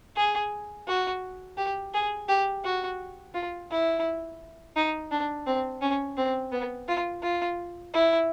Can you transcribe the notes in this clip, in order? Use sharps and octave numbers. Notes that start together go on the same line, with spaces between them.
G#4
F#4
G4
G#4
G4
F#4
F4
E4
D#4
D4
C4
C#4
C4
B3
F4
F4
E4